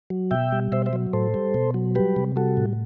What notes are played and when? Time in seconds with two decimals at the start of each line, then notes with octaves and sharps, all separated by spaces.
0.10 F#3
0.31 B2 E5 G5
0.52 G3
0.72 B2 C5 E5
0.86 C5 E5
0.93 F#3
1.13 A2 A4 C5
1.34 G3
1.54 B2
1.74 F#3
1.95 G3 G4 B4
2.16 C3
2.36 G3 F#4 A4
2.57 A2